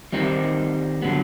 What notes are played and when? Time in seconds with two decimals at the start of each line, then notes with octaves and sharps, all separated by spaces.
0.12 D#3 G3 C4 D#4
1.02 D3 F#3 B3